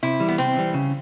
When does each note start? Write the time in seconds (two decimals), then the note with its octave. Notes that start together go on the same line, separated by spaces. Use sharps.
0.03 C3 E4
0.20 E3 G3
0.28 B3
0.38 C3 C4
0.57 E3 G3
0.74 C#3